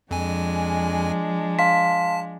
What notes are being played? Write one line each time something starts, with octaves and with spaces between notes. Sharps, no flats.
F2 F3 G#3 D4 G#5
F5 A5 C6 B6